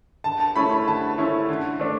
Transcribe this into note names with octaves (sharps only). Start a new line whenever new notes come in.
D3 A5
A5
A3 C#4 E4 B5
B5
D3 A5
A3 C#4 E4
D3
A3 D4